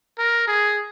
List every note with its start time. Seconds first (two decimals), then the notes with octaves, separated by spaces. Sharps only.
0.19 A#4
0.48 G#4